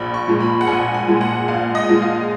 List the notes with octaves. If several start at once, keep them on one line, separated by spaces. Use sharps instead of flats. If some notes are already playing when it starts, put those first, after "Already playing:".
Already playing: A#1 B5
C#6
A#2 F3 G#3
B5
F#5
A#1 G#5
G#5
A#2 F3 G#3
F#5
A#1 F5
D#5
A#2 F3 G#3
F5